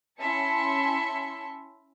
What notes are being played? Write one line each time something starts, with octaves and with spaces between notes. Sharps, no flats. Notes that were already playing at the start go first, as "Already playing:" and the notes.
C#4 E4 E5 A5 C6 C#7